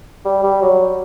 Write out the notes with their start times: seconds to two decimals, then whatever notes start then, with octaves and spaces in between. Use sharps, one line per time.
0.25 G3
0.44 G3
0.62 F#3